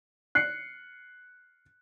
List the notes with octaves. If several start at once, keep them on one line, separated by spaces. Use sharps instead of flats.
F#6 C7 C#7